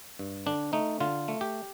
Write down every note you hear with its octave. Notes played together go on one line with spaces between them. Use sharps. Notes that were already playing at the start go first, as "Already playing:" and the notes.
G2
D3 D4
A3 D#4
D3 F4
A3
G4